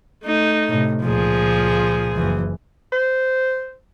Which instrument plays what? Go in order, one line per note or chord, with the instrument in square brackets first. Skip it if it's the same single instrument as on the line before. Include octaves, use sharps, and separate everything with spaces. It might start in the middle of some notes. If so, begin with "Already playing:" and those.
[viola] A3 D#4
[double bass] A2 C3
[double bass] C#2 A#2 [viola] F3 G#4
[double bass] F#1 E3
[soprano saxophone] C5